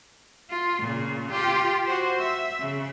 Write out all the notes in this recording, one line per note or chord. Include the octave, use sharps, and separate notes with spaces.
F4
A#2 C#3
F4 G4
F#4 C5
E5
C#3